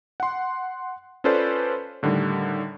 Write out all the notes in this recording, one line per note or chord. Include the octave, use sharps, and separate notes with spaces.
F#5 C6
C#4 F4 A4 B4 C5 D5
A2 D3 D#3 G3